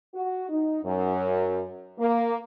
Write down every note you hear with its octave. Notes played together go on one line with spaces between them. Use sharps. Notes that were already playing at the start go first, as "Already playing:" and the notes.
F#4
D#4
F#2
A#3